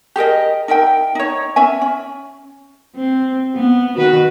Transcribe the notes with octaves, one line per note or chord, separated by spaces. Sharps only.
G4 G#4 A#4 D#5
D#4 A#4 E5 G5
D#4 C#5
C#4 E5 G#5
C#4
C4
B3
D#3 F#4 B4